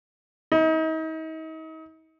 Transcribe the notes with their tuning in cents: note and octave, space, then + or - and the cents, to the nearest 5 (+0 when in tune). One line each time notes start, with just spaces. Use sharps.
D#4 +40